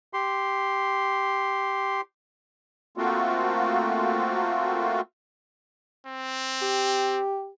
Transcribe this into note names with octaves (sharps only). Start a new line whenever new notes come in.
G4 C6
A3 A#3 C4 F4 F#4
C4
G4